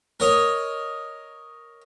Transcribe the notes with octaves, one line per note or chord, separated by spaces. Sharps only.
A#4 C#5 D#5